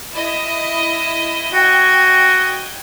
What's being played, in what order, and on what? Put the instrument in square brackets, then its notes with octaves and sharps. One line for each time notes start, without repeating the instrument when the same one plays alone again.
[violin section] E4 D#5
[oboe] F#4 [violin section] D#5 G5 G#6